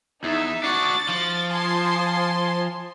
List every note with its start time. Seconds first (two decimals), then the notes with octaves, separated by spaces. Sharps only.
0.24 E2 D#4 E5
0.64 D4 F#4 A6
1.09 F3
1.51 G#5 A5 C6